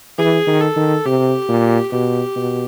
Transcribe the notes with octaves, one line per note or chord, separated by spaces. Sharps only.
E3 G#4
D#3
A4
D#3
C3 G4
A#2
B2 G4
B2